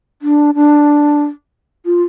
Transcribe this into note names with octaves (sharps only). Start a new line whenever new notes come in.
D4
D4
F4